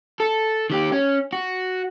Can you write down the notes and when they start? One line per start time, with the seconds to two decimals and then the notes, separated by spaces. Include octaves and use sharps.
0.20 A4
0.70 D#3 G4
0.92 C#4
1.33 F#4